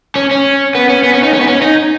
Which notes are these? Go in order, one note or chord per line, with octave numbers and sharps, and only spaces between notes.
C#4
C#4
B3
C#4
B3
C#4
D#4
C#4
B3
C#4
D#4